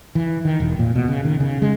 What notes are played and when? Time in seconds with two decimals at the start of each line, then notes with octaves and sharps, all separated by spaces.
0.15 E3
0.45 D#3
0.60 E1
0.79 A#2
0.95 B2
1.08 C#3
1.25 D#3
1.40 C#3
1.62 G#3